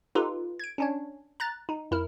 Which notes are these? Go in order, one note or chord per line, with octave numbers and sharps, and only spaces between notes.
D#4 F4 G4 A4 B4
G#6 D7
C#4 D4 C#5
A#5 F#6 A6
D#4
F2 E4 A#4 F6